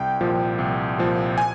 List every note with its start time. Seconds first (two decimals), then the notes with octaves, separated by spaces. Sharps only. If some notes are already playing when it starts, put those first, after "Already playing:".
Already playing: C2 G5
0.21 A#2 F3
0.59 C2
0.98 A#2 F3
1.38 G#5